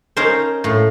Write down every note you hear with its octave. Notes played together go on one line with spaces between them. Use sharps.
C#4 D#4 A#4 C5
A2